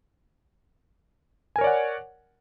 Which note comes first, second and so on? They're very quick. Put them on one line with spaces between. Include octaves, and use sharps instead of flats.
G#5 A#4 C#5 D5 F#5